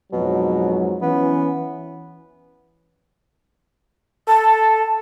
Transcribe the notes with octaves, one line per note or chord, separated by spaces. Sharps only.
F2 G#2 B2 F#3
E3 B3 C#4
A4 A5